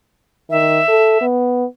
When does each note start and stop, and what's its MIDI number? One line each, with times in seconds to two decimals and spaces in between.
0.50 0.80 51
0.50 1.25 76
0.88 1.17 69
1.21 1.65 59